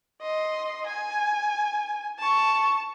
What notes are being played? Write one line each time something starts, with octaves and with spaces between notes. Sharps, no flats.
D#5 C6
G#5
A5 C#6